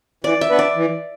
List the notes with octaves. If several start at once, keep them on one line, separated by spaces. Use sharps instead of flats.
E3 D5
E5
B3 D4 B4
D5
E3